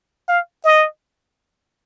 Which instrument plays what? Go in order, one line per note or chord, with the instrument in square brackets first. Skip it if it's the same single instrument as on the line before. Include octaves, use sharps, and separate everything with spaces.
[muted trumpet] F5
D#5